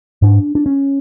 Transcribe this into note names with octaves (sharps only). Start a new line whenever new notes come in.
G#2 D4
D4
C#4